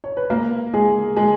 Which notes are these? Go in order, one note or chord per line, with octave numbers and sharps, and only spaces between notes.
C#5
B4
A#3 A#4
G#3 G#4
G#3 G#4